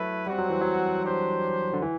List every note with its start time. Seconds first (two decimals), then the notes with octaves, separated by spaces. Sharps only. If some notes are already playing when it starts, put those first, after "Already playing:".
Already playing: F#3 A3 E4 B4
0.27 G3 C4 F#4 C5 F#5
0.38 F#3
0.50 E3
0.62 F#3
1.04 D4 G4 C5
1.73 D3
1.82 E3